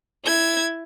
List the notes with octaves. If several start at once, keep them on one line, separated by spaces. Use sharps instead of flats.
E4 G#6